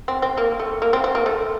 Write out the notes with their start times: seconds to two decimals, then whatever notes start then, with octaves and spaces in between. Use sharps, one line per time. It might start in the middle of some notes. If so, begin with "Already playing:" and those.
0.08 C4
0.22 C4
0.37 A#3
0.60 A3
0.82 A#3
0.93 C4
1.04 C4
1.15 A#3
1.26 A3